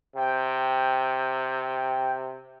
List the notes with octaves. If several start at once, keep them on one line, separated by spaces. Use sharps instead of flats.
C3 G5